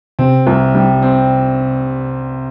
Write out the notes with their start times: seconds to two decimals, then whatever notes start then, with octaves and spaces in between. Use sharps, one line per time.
0.19 C3 C4
0.47 C2
0.75 G3
1.02 C4